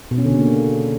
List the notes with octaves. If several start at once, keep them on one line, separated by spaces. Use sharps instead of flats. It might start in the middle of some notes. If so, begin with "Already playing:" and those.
B2
C#4
D3
C#3
A#3